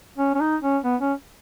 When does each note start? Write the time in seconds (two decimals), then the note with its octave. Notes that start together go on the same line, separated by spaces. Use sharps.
0.18 C#4
0.35 C#4
0.41 D#4
0.62 C#4
0.84 B3
1.01 C#4